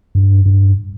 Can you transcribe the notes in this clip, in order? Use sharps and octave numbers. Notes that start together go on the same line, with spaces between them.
G2
G2